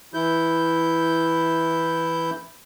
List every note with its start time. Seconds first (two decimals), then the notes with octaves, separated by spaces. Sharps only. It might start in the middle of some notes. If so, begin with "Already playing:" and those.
0.14 E3 E4 G6